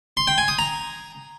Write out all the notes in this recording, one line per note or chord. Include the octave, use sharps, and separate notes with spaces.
C6
G5
G#5
D#6
A#5